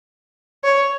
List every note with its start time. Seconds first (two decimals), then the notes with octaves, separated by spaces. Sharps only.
0.64 C#5